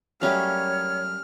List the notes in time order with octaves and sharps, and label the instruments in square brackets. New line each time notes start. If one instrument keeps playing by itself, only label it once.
[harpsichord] F#2 F#3 A3 [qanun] G3 C#4 F5 [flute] C#5 [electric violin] F6